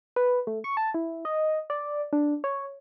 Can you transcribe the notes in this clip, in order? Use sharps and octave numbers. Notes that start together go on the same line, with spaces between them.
B4
A3
C#6
A5
E4
D#5
D5
D4
C#5